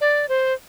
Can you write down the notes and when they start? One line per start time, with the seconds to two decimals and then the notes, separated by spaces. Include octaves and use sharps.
0.01 D5
0.29 C5